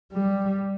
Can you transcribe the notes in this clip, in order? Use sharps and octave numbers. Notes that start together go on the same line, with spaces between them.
G3